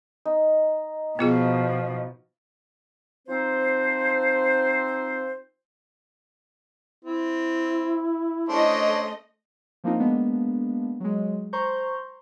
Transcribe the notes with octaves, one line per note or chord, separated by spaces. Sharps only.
D#4
B2 F3 B3 F4 G#4
F3 C4 D#4 C5
C4 E4
A3 C#4 D4 C5 D#5
F3 A#3 C4 D4 D#4 F4
G#3 A#3 B3 D4
F#3 G#3
C5 A#5 C6 C#6 G6